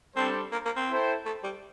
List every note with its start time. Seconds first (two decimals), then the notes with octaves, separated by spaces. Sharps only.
0.16 G3 C4 D4 A4 C5
0.52 A#3
0.65 A#3
0.77 C4
0.89 E4 A4 C5 G5
1.25 A3
1.44 G3